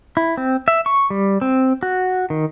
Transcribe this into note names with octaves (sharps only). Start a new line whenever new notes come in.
E4
C4
E5
C#6
G3
C4
F#4
D#3